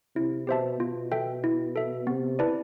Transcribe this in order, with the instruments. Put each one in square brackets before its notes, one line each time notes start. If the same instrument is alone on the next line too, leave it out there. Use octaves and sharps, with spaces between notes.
[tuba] C3 [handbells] E4
[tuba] B2 [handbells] G4 C5 E5 A5
[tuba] B2 [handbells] F4
[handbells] A4 E5 G5
E4
A4 E5
[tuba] C3 [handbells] B3
[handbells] E4 B4 D5 A5